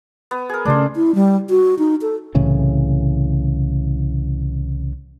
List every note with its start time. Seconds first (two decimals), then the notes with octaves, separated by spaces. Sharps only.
0.31 B3
0.49 G#4 A#4
0.65 C#3 A3 D4 C5
0.95 E4
1.15 G3
1.50 F#4
1.79 D#4
2.02 A4
2.35 C2 A2 C#3 E3